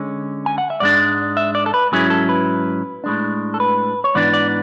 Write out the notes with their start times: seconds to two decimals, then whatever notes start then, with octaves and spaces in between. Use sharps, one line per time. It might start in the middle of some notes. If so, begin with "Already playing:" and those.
Already playing: D3 G#3 C#4
0.46 G#5
0.58 F#5
0.70 E5
0.80 G#2 G#3 D4 D5
1.37 E5
1.55 D5
1.66 A4
1.74 B4
1.92 G#2 F#3 C#4 E4 G#4
2.10 A4
2.29 B4
3.04 A2 G#3 D4
3.54 A4
3.60 B4
4.04 C#5
4.15 G#2 E3 B3 D4 D5
4.33 D5